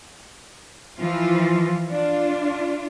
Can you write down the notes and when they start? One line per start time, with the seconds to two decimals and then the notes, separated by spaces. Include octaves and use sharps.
0.98 E3 F3 F4
1.90 D4 F4